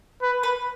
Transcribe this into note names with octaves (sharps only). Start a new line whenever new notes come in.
B4
B4